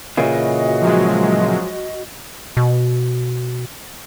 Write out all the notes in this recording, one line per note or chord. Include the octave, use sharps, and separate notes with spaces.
A#2 C#3 E3 F#4 D#5
F3 F#3 G#3
B2